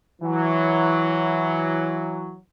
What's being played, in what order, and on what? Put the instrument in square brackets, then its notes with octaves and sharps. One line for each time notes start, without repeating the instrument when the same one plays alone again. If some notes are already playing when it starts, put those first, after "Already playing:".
[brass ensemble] E3 F#3